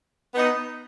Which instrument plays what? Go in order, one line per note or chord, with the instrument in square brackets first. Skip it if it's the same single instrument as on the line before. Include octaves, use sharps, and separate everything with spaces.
[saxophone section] B3 D#4